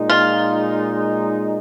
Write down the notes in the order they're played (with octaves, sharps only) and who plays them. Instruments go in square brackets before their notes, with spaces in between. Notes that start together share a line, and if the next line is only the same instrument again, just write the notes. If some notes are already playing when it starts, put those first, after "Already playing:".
Already playing: [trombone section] A#2 G#3 D#4
[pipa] F4